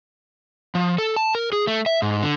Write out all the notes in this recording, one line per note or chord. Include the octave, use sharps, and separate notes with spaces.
F3
A4
A5
A#4
G#4
A3
E5
G#2
D3